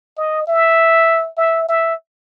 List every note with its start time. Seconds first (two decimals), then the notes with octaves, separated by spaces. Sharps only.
0.17 D#5
0.47 E5
1.38 E5
1.68 E5